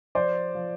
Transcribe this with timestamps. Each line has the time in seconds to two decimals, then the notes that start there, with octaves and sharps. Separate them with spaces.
0.15 F3 C5 D5
0.55 F3